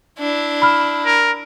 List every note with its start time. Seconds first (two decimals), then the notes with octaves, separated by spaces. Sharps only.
0.19 D4 E4
0.62 B5 F6
1.06 A#4